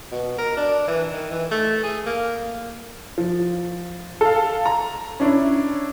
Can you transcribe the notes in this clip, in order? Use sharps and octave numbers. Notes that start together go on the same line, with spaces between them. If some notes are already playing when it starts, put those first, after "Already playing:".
B2
A#4
D4
E3
D#3
E3
A3
G#4
A#3
F3
A4 F5
A#5
C#4 D4 E4